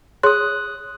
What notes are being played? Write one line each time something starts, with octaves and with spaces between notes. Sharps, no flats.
G#4 C#5 C6 D#6 F#6